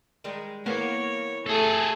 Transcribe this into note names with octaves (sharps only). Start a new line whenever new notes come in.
D#3 G3 G#3
E3 A#3 B3 C#5
A3 G#4 A4